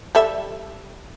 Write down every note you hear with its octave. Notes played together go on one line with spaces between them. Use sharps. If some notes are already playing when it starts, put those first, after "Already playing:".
G3 A4 E5